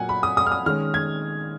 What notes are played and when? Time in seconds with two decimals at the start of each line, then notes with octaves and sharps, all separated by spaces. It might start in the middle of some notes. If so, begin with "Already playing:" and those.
Already playing: A#2 F#3 A#3 F#5 G#5
0.09 B5
0.23 D#6
0.37 D#6
0.46 F6
0.52 D#6
0.66 D#3 G#3 C#4 F6
0.94 G#6